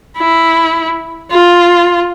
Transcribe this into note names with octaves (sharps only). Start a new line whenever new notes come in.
E4
F4